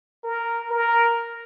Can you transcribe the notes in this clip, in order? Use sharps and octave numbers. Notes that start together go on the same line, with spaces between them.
A#4
A#4